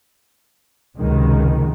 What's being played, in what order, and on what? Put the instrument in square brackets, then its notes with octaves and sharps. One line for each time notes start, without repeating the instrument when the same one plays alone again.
[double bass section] C#2 F#2 C3 D#3 F#3 G#3